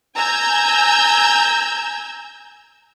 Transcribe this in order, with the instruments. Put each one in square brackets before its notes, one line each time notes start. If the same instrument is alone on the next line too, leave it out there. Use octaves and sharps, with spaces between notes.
[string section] G#5 A#5 E6 G6 G#6